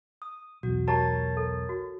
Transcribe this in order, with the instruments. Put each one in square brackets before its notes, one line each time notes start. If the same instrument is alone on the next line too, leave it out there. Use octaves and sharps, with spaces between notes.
[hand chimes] D#6
[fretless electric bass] B1 E2 [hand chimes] F#4
[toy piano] G4 A5 A#5 [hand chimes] A#4 C#5 A6
[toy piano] A4
F#4